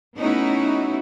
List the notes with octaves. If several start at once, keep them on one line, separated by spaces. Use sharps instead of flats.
A3 B3 C#4 D#4 E4 F#4